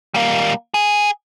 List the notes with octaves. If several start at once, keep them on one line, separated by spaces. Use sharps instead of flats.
G3 A#3
G#4